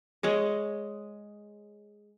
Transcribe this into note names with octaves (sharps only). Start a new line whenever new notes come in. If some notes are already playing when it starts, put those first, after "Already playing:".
G#3 C#5 D#5